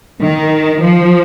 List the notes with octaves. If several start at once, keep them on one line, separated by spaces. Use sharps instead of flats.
D#3
F3